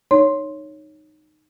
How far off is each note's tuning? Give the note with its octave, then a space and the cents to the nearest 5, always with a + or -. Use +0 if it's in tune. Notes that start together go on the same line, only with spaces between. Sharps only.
D#4 -15 C#5 +0 C6 +5